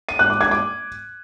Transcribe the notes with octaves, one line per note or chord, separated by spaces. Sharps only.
D#7
F#6
D6
G#6
D6